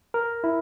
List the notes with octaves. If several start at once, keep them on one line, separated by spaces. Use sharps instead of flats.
A#4
E4